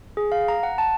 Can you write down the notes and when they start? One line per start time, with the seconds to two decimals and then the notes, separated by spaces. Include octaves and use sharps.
0.17 G#4
0.32 F5
0.48 A#5
0.63 F#5
0.78 A5